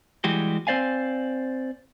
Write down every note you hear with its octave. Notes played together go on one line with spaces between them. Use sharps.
E3 G3 G#3 F#4 G4
C4 C5 D5 F5 G#5